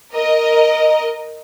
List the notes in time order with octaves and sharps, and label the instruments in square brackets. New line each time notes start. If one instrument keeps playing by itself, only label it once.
[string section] A#4 D#5